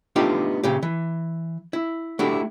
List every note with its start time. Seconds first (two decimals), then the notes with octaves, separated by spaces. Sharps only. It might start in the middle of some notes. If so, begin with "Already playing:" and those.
0.16 A3 B3 D4 D#4 F4 G4
0.63 A#2 C#3 G4
0.83 E3
1.73 E4
2.19 A3 D4 E4 F#4 G4